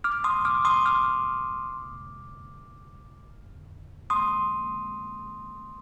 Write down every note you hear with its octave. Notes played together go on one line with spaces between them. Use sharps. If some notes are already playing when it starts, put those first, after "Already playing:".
D6 F6
C6 D#6
D6 F6
C6 D#6
D6 F6
C6 D#6